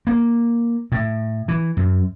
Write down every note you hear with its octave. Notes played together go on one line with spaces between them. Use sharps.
A#3
A2
E3
F#2